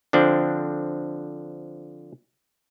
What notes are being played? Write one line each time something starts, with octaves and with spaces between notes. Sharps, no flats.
D3 F3 C4 D4